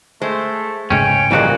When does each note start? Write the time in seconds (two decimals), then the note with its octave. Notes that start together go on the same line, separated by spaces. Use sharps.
0.22 G#3 A3 C5
0.90 A1 G#2 C#3 C#4 G5
1.31 C2 A#2 E3 F3 G#3 F#4